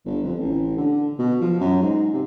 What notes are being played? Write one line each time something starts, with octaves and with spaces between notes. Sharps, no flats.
G1
F2
A1
D3
B2
F3
F#2
G#2
C3